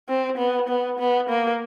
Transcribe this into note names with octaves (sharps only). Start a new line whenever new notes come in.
C4
B3
B3
B3
A#3